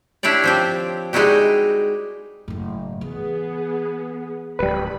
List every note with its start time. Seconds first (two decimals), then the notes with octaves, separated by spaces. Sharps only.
0.23 D4 E4 G4 C#5 D5
0.44 F3 C4 G4
1.13 G3 G#3 D#4 E4 F#4 G4
2.48 F#1 A2
3.01 E3 B3 G#4
4.59 D1 G3 B4 B5